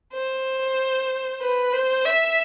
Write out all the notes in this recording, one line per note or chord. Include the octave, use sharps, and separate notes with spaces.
C5
B4
C5
E5